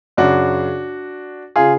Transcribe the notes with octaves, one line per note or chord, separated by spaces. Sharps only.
F#2 C#3 D4 F#4
C#3 F4 G#4